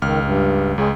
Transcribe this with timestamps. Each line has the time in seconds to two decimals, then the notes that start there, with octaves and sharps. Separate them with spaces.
0.02 C#2 D#3 F6
0.25 G2
0.78 C#2 G#3 C#4 G#4 G5